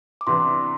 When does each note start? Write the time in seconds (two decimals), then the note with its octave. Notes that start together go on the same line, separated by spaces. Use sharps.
0.21 D6
0.27 C3 E3 B3 D4 C6